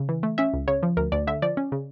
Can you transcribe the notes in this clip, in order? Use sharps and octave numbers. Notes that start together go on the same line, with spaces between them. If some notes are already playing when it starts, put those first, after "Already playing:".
Already playing: C#3
E3
A3
C#4 E5
C#2
C#3 C#5
F3
D2 A#4
D2 D5
D3 E5
F3 D5
C#4
C#3